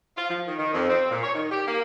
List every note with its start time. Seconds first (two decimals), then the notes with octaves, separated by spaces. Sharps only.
0.16 F4
0.29 F3
0.47 D#3
0.59 D#3
0.74 F2
0.89 C4
1.11 A#2
1.23 C#5
1.35 D#3
1.51 G4
1.68 A#3